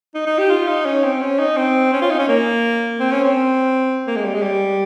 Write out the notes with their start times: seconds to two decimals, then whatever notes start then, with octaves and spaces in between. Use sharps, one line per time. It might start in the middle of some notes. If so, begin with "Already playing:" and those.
0.15 D#4
0.26 D#4
0.38 G4
0.50 F4
0.67 D#4
0.86 C#4
1.04 C4
1.21 C#4
1.39 D#4
1.57 C4
1.93 C#4
2.02 F4
2.10 D#4
2.19 C#4
2.28 A#3
3.00 C4
3.12 C#4
3.24 C4
4.07 A#3
4.16 G#3
4.25 G3
4.34 G#3
4.42 G3